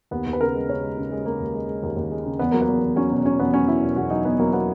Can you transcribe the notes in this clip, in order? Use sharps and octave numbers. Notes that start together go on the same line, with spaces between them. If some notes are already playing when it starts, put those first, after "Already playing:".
D#2 B3
D#2
B4
C#3 A#4
G#3
C#3 C#5
G#3
C#3
G#3
G#3 A#3
D#2
G#3
G#3
D#2
D#2
G#3
C#3
E2 B3
F#3 A#3
B3
E2
E2
F#3 C#4
B2
B2 C#4
E2 B3
F#3 C#4
F#3 E4
B2
E2 F#4
F#3 D#4
E2 B3
F#3 A#3
F#3 B3